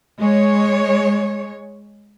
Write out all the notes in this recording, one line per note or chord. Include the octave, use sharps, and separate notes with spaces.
G#3 C#5